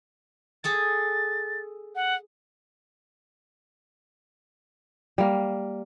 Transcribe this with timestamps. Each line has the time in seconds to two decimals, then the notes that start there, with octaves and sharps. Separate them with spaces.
0.64 G#4 A4 A5 A6
1.95 F#5
5.18 G3 A#3